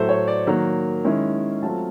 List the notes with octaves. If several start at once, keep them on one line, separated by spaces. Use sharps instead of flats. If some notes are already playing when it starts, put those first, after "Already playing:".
Already playing: A2 F#3 A3 C5
C#5
D5
D#3 F#3 A#3
D#3 G#3 C#4 E4
F#3 A3 C4 F4 A5